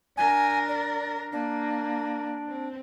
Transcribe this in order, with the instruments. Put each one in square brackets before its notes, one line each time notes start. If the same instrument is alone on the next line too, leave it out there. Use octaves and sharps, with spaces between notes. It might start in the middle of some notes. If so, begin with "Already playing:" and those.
[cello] D4 A#4 [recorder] G#5
[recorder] D5
[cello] A#3 [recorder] D4
[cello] C4